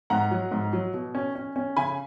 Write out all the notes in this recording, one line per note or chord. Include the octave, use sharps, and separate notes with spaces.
G#2 F#5 A#5
F#3
G#2
F#3
B2
C#4
C#4
C#4
C#3 G#5 B5